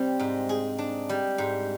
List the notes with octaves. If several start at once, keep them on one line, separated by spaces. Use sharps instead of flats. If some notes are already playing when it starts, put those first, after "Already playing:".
Already playing: G3 C4 D4
G#2
G#4
D4
G3
G#2